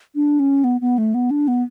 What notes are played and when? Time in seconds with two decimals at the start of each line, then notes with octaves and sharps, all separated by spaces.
0.15 D4
0.40 C#4
0.64 B3
0.81 B3
0.98 A3
1.14 B3
1.31 D4
1.48 B3